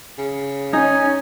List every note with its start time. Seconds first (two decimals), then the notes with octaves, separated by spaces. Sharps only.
0.18 C#3
0.73 C#4 D#4 G#5